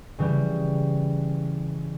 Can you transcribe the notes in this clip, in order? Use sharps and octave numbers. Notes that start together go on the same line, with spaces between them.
C#3 E3 G3